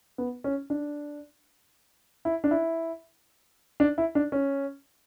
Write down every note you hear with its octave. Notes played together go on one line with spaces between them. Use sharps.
B3
C#4
D4
E4
D4
E4
D4
E4
D4
C#4